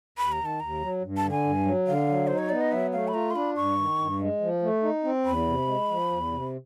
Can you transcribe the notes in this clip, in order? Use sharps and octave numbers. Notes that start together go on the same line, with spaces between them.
D#2 B5
A#5
D#3
A5
D#2 A#5
F#3
G2
A5
D3
G#5
G2
F#3
D3 F5
F#3
D#4 C5
C#5
B3 D5
D#5
F#3 E5
A3 F5
B5
F4 A#5
C6
D4 B5
G2 C#6
D#3
G2
G#3
F3
A3
D#4
C4
E2 B5
C3
G#3
F3
E2
C3